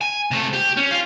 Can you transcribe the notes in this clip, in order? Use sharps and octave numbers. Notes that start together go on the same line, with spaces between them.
G#5
C3 A3
G4
C#4
F4